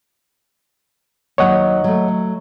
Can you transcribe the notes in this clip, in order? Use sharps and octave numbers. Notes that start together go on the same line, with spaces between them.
D#2 F#3 D#4 C#5 D#5 F#5
F#3 A3